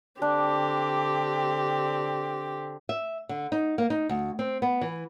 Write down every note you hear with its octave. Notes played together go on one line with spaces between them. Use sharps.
D3 C4 D4 G4
E5
D3
D#4
A#3
D#4
D2
C4
B3
E3